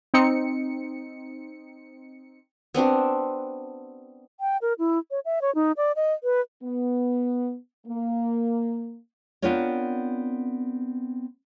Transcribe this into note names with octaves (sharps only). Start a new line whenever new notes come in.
C4 D#4 C#7
B3 C4 D4 F#4
G5
A#4
E4
C#5
E5
C#5
D#4
D5
D#5
B4
B3
A#3
B3 C4 D4 F4 A#4 C#5